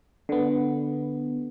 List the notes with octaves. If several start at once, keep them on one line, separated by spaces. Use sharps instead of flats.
D3 B3